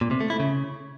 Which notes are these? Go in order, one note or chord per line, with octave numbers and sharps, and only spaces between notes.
A#2
C3
A3
E4
C#3